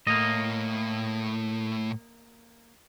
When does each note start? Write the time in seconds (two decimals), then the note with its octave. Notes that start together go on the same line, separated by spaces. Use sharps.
0.07 A2 A#3 D#5